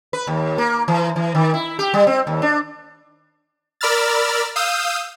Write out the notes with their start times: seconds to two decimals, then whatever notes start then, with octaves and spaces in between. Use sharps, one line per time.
0.13 B4
0.27 D#2
0.58 A#3
0.88 E3
1.16 E3
1.35 D#3
1.54 E4
1.79 G4
1.94 G3
2.07 C4
2.27 D#2
2.42 D4
3.81 A#4 D5 B5 E6 F6 A6
4.56 F5 D#6 E6 G6